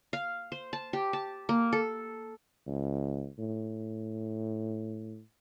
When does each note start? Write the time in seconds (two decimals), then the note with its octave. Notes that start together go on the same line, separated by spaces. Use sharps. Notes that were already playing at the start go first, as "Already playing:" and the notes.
0.13 F5
0.52 C5
0.73 A5
0.93 G4
1.13 A5
1.49 A#3
1.73 A4
2.67 C#2
3.39 A2